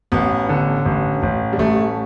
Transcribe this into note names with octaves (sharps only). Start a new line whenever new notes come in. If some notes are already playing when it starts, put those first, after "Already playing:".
A1 B3
D3
A1
A1
G3
A1 A3